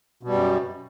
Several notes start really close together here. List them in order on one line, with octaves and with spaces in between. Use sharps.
B2 G3 F#2